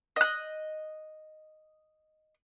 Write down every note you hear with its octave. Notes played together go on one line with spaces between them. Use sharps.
D#5 F#6